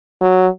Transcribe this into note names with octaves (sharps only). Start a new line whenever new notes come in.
F#3